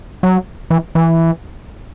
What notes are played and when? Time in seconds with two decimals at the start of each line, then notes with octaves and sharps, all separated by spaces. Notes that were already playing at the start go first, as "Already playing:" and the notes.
0.23 F#3
0.70 E3
0.95 E3